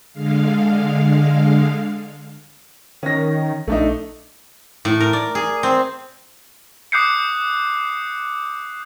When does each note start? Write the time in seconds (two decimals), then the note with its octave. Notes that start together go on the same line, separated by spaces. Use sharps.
0.13 D3 G#3 F5
3.03 D#3 C#4 A#6
3.67 A#1 A3 D4 D#4
4.85 A2
5.00 A#4
5.13 D5
5.35 G#4
5.63 C4
6.92 D6 D#6 F#6 G6 C7 C#7